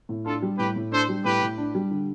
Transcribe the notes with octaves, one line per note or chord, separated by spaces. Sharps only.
A2
D4 F4 A4
G3
A2 G4 B4
A2
D4 A4 C5
G3
A2 G4 B4
A2
D4
G3
D3